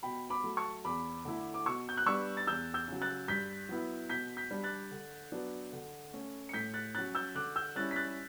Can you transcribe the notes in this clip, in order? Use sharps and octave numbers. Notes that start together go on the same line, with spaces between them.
B2 G5 B5
B5 D6
F#3 A3
A5 C#6
E2 B5 D6
D3 A3 E4
D6
B2 C#6 E6
G6
F#6
G3 B3 D4 C#6 E6
A6
E2 E6 G6
E6 G6
C#3 F#3
F#6 A6
G2 G6 B6
F#3 B3 E4
B2 G6 B6
G6 B6
G3 D4
F#6 A6
D3
F#3 B3 D4
D3
A3 C#4
C#7
A2 G6 B6
F#6 A6
F#3 C#4 F#6 A6
E6 G6
D3 D6 F#6
E6 G6
G3 C#4 E4 F#6 A6
B6
F#6 A6